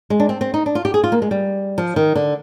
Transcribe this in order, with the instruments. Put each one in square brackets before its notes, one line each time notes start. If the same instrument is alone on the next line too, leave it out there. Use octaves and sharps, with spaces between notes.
[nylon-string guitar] G#3
D4
C4
C4
D#4
D4
F4
G4
G#4
F4
A#3
G#3
G3
F3
D#3
D3